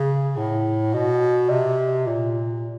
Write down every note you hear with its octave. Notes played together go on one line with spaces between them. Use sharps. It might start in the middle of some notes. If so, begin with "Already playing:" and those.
Already playing: C#3
A2
B2
C3
A#2